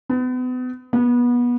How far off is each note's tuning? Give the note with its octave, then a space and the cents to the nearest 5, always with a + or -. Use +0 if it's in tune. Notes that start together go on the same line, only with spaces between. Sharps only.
B3 +35
B3 -25